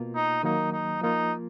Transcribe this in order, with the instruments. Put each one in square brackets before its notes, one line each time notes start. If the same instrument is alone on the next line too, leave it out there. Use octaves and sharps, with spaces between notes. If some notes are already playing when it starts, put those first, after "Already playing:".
Already playing: [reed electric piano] B2 A#3 F4
[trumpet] D#4
[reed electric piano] D#3 F#3 A#3 [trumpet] D#4
[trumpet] D#4
[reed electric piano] F3 A#3 F4 [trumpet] D#4